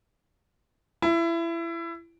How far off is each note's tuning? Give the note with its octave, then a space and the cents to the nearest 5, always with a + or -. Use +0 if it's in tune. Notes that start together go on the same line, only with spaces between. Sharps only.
E4 +25